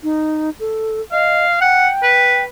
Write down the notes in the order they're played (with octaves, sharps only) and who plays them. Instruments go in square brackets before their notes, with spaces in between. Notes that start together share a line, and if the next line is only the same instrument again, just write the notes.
[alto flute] D#4
A4
[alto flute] D#5 [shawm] F5
[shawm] F#5 [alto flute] G5
[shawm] B4